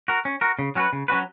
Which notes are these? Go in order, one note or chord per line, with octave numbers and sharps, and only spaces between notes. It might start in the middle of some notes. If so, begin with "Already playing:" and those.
F#4 A#4
C#4
F#4 A#4
C#3
F#3 C#4 F#4 B4
C#3
F#3 C#4 F#4 B4